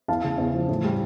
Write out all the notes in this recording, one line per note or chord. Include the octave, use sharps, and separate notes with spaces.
E2 F5 A5
C#3
E2
F3
A2
G3